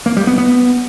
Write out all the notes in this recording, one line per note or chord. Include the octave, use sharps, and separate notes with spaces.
A#3
G3
B3
B3